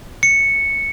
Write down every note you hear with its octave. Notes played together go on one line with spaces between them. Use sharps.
C#7